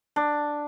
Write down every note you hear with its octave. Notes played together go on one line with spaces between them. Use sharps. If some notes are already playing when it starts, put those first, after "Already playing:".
D4